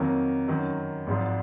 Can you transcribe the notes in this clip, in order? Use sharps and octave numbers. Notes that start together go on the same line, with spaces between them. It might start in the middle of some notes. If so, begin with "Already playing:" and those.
Already playing: F2 D#3 F#3 A#3
F#2 D#3 F#3
G#1 G#2 F3